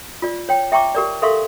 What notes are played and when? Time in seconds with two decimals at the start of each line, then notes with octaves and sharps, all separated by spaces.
0.22 F4 D5
0.49 C#5 G5
0.72 E5 G5 A#5 C#6 D6
0.95 G4 A#4 D5
1.22 A4 A#4 E5 F5 C6 C#6